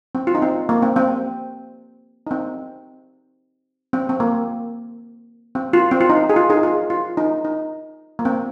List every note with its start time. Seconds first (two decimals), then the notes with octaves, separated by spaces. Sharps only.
0.15 C4
0.27 F4
0.35 D#4
0.42 C4
0.69 A#3
0.82 C4
0.96 C4
2.27 D#4
2.31 C4
3.93 C4
4.09 C4
4.20 A#3
5.55 C4
5.73 F4
5.91 C4
6.01 F4
6.10 D#4
6.30 G#4
6.36 F4
6.50 D#4 G#4
6.63 F4
6.90 F4
7.17 D#4
7.45 D#4
8.19 A#3
8.25 C4